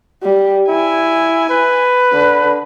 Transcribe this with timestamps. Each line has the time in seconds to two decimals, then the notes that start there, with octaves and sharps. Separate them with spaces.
0.23 G3
0.69 E4 G#5
1.50 B4
2.13 D3